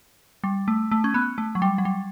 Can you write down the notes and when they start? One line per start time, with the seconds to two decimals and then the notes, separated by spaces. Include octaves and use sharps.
0.44 G3
0.68 A3
0.91 A3
1.04 C#4
1.14 B3
1.38 A3
1.55 F#3
1.62 G3
1.78 F#3
1.85 G3